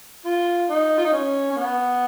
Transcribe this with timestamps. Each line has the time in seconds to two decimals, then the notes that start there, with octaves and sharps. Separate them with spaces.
0.26 F4
0.70 D#4
0.98 F4
1.05 D#4
1.13 C#4
1.51 C#4
1.57 B3